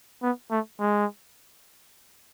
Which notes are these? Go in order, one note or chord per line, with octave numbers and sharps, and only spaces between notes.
B3
A3
G#3